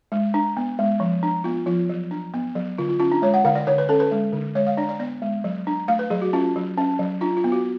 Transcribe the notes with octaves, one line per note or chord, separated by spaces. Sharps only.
G#3
D4
B3
G#3
F3
D4
B3 F4
F3 F4
F#3
D4
B3
F#3
D3 F4
F4
C#4 F4
D4
G#3 C#5
F#5
D3 F5
D5
D3 C#5
B4
C#4 A4
B4
G#3
D3
G#3 C#5
F5
D4 D5
D5
B3 D5
G#3
F#3
D4
A3 F5
B4
F#3 G#4
F#4
C#4 F4
F#3
C#4
F#3
D4 F4
F4
B3
F#4